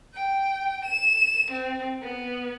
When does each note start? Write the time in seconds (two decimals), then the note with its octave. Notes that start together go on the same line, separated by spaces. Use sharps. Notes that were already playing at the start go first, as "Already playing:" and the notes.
0.13 G5
0.85 E7
1.51 C4
2.02 B3